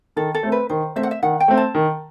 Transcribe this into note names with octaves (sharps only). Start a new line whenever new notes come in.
D#3 A4
A4
A3 C4
B4
D#3 C5
A3 C4 E5
F#5
E5
D#3 F#5
G5
A3 C4
A5
D#3